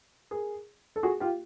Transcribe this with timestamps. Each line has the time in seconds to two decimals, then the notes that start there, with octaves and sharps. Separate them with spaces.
0.31 G#4 A#4
0.96 A4
1.03 F#4 G#4
1.20 F4 G4